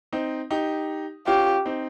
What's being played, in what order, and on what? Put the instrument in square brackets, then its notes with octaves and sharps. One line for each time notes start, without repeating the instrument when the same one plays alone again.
[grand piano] C4 D#4
D#4 G4
[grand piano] C#4 F4 [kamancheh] G4
[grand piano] C4 D#4